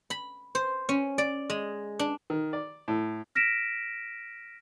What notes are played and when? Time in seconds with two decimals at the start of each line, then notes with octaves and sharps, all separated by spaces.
0.10 B5
0.55 C5
0.89 C#4
1.18 D5
1.50 G#3
1.99 D4
2.30 D#3
2.53 D5
2.88 A2
3.35 F6 A#6 B6 D7 E7